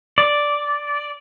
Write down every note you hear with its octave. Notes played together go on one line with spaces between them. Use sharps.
D5